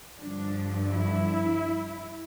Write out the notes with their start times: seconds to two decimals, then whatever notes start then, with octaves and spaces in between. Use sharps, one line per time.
0.19 G2 D3 F3 D4
0.92 E4